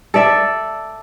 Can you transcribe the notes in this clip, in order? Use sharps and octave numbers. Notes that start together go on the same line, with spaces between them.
A4 D5 E5